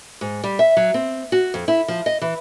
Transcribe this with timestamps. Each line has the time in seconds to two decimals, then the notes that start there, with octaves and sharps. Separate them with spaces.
0.21 G#2
0.44 G3
0.59 E5
0.77 F#3
0.94 C4
1.32 F#4
1.54 F2
1.68 E4
1.88 F3
2.06 D#5
2.21 E3